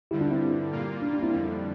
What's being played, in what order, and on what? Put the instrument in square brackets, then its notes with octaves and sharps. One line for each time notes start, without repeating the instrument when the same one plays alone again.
[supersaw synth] G2 D3 G3 [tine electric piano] E4 G4
[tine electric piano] D4 F4
C4 E4
[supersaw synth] A#2 G3 A#3 F4
[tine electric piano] D4
D4
C4 E4
[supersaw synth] F2 D3 G3